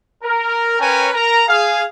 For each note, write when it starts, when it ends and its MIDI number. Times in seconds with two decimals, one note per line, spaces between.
0.24 0.76 70
0.80 1.09 61
0.80 1.09 70
0.80 1.09 71
0.80 1.09 73
0.80 1.09 79
0.80 1.09 80
1.14 1.42 70
1.14 1.42 82
1.48 1.83 68
1.48 1.83 77